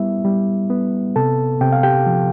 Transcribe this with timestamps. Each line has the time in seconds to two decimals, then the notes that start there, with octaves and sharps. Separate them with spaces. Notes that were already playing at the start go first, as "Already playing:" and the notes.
Already playing: G3 B3 E4 E5
0.25 G3
0.70 B3
1.16 C3 A4 A5
1.61 C3 G5
1.72 F5
1.83 G4 G5
2.06 F3